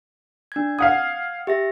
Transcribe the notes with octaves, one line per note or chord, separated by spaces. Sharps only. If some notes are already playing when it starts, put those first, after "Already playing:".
D4 G#6
F5 F#5 D#6 G#6
G4 E5 A#6